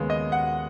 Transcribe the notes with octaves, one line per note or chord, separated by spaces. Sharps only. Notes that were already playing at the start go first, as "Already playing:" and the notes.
Already playing: D#2 C#3 G#3 B3
D#5
F#5